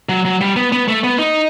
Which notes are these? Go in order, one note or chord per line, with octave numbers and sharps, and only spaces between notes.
F#3
F#3
G3
B3
B3
A3
B3
D#4